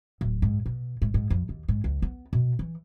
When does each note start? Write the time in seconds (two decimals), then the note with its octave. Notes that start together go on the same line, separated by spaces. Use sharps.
0.21 D1
0.42 G#2
0.66 B2
1.02 G#2
1.14 G#2
1.30 F2
1.49 D#2
1.68 G#2
1.84 C#2
2.02 B3
2.33 B2
2.59 E3